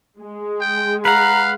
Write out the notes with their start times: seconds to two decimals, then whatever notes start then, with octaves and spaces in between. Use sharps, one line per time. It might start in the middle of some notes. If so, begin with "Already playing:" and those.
0.20 G#3
0.61 G5
1.05 B4 F5 F#5 A#5